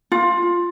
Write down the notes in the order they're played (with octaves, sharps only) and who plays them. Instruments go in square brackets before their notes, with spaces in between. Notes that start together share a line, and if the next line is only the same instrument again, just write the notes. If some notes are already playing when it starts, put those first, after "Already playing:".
[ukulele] F4